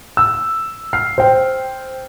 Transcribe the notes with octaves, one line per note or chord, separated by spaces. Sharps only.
E6
F6 C7
C5 G5